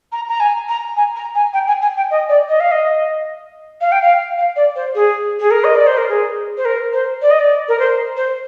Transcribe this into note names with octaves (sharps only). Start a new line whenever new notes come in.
A#5
A#5
G#5
A#5
G#5
A#5
G#5
G5
G#5
G#5
G5
D#5
D5
D#5
F5
D#5
F5
G5
F5
F5
D5
C5
G#4
G#4
A#4
D#5
D5
C5
A#4
G#4
C5
A#4
C5
D5
D#5
D5
A#4
C5
C5